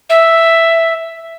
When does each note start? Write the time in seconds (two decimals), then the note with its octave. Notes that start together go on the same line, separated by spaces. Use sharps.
0.10 E5